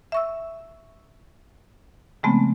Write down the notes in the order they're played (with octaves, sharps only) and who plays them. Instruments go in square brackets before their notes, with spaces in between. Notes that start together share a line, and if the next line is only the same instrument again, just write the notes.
[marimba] E5 C#6 E6
C#3 F3 G#3 A3 B3 C4